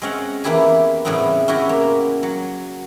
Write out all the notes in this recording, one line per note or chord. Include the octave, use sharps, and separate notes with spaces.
G#3 C4 C#4 F5 F#5
E2 E3 A#3 E4 G4 G#5
A2 C#3 E3 G3 B3 C4
C#4 E4 F#4 G4
A#3
F#3